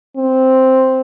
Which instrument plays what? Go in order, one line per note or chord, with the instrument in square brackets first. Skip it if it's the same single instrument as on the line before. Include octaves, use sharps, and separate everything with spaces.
[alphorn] C4